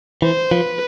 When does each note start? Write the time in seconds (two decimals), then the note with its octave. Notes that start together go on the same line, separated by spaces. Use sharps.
0.22 E3 C5
0.51 F3 B4